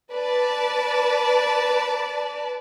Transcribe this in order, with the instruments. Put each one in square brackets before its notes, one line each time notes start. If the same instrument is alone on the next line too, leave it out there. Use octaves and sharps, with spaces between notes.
[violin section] B4 D5 A5